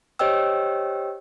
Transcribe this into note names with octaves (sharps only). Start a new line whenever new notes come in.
G4 C5 C#5 D#5 G5 E6